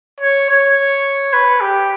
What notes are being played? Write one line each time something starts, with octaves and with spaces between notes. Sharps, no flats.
C#5
C#5
B4
G4